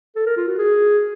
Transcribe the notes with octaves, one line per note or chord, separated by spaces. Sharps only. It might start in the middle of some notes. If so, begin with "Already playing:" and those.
A4
A#4
F4
F#4
G#4